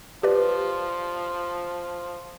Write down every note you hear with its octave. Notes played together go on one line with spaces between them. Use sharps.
F3 G4 B4 D5